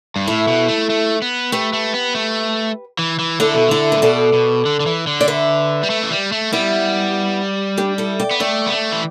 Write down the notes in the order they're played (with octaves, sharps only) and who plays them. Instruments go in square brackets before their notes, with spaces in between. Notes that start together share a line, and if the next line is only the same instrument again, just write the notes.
[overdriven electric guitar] G2
[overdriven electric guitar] A2 [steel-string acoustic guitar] E4 A4
[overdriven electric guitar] B2
A3
A3
B3
[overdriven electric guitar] A3 [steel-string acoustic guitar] G4 B4
[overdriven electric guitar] A3
B3
A3
E3
E3
[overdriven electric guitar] D3 [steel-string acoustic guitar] E4 A4
[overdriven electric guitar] B2
[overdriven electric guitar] D3 [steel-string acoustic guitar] E4 A4
[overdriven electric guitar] A2 [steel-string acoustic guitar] B4
[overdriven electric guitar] B2 [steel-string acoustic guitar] A4 D5
[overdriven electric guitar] B2
D3
D3
E3
D3
[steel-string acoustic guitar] D5
B4 E5
[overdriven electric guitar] G3
A3
E3
G3
A3
[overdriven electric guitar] G3 [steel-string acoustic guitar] B3 E4
[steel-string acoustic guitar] D4 G4
E4 A4
D5 G5
[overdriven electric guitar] B3
[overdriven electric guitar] A3 [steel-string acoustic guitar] D5 G5
[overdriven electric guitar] B3
A3
E3